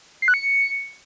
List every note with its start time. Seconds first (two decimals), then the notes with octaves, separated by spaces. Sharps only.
0.22 C7
0.28 F#6
0.34 C#7